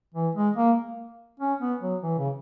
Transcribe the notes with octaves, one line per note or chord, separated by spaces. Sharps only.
E3
G#3
A#3
C#4
B3
F#3
E3
C#3